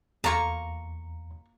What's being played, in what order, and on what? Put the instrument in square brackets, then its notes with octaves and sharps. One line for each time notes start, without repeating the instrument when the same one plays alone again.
[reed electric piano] E2 [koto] A#3 F4 A5 [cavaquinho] A#5 C#6